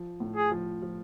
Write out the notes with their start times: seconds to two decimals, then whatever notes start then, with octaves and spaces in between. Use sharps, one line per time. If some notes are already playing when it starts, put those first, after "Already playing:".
Already playing: F3
0.20 A2
0.36 G#4
0.51 F3
0.82 F3